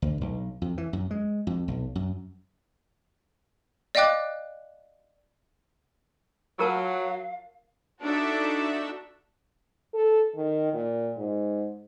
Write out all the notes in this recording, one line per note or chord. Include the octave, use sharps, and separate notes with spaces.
D2
B1
F2
E3
F#2
G#3
F2
B1
F#2
D5 D#5 F5 G5 D6 F#6
F#3 F4 A#4 F5 A5
D4 D#4 F#4 A4 E5
A4
D#3
A#2
G#2